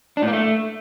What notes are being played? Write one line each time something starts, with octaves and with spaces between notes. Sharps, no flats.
D4
A2
A#3
A3